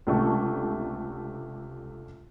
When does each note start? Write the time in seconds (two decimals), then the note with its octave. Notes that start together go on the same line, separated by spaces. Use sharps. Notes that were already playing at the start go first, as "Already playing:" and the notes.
0.07 C#2 C3 A3 D4 C#6